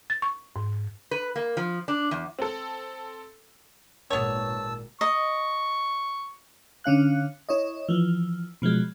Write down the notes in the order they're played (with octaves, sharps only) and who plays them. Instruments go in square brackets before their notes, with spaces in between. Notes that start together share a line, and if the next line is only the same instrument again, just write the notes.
[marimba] A6
C#6
G#2
[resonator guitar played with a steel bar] B4
A#3
F3
D4
E2
[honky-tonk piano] C4 A4
[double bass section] G#1 A#2 [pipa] B3 C#5 [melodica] A5 E6
[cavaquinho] D#5 [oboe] C#6
[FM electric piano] D3 C#4 F5 F#6
E4 C#5 D#5
E3 F3
B2 F3 F#3 G#3